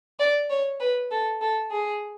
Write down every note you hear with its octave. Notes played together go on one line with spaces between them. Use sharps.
D5
C#5
B4
A4
A4
G#4